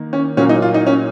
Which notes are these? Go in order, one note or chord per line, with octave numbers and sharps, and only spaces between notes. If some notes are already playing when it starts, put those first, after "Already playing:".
Already playing: D#3 A#3
C#4
A#2 F#3 A#3 C#4
D#4
F4
D#4
C#4